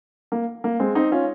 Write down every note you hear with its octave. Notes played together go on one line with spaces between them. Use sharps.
A#3
A#3
G#3 C4
C4 D#4
C#4 F4